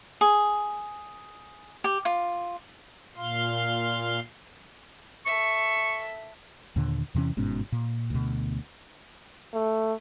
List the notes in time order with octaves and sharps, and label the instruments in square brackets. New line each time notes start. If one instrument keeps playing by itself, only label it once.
[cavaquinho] G#4
G4
F4
[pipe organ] A#2 F5 C6
[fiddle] A4 E5 [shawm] C#6
[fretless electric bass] D#2 A#2 D3
E2 C3 E3 C#4
G1 G#2 B2 C#4
A#2
D2 B2
[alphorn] A3